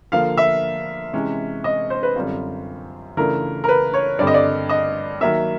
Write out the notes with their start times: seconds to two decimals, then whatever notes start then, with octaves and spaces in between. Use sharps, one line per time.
0.12 D3 F3 A#3 F5
0.37 E5
1.13 C3 E3 G#3 C#4
1.64 D#5
1.90 C5
2.03 B4
2.16 F#2 D3 G3 C4 F4
3.17 C#3 E3 A3 D4 F4 A#4
3.64 A#4
3.69 B4
3.94 C#5
4.19 G2 D3 G3 C4 D5
4.27 D#5
4.34 D5
4.69 D#5
5.21 D#3 F#3 A#3 E5